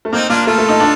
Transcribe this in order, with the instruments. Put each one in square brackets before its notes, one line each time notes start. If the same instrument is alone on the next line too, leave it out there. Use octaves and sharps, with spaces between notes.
[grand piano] A3
[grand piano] A#3 [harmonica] C4 D#4
[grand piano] A#3 [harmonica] D4 F4
[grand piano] A3 [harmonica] F4 A4
[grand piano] A3
D#4
D4